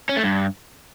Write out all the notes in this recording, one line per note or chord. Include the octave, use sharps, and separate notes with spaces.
C#4
A3
G2